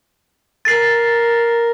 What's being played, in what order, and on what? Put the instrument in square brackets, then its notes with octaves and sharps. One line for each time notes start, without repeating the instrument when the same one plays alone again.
[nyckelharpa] A#4 [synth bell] A6 C7